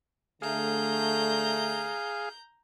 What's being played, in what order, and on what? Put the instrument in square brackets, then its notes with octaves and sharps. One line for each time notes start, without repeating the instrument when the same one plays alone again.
[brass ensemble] D3 A3 [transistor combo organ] G#4 F5 [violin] A#5 G6